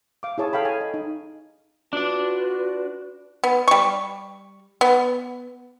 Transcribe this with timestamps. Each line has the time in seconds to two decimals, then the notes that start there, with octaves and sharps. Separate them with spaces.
0.23 F5 D6
0.38 E4 G#4 C#5 A5 D#6
0.53 A4 F5 G5 B5
0.65 G#5
0.81 D#5
0.94 D#4
1.93 D4 F4 F#4 B4 D5
3.44 B3
3.68 G3 C#6
4.81 B3